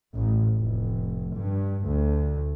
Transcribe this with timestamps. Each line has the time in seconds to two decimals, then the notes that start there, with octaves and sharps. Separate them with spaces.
0.15 A1
0.56 F1
1.36 G2
1.84 D2